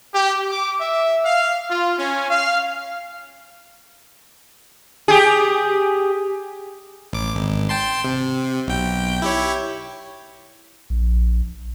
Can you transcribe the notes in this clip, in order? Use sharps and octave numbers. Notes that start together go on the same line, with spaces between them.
G4
D6
E5
F5
F4
C#4
F5
G4 G#4
A1 D6
G#1
G5 A5 C6
C3
B1 G5
E4 G4 C#5
A#1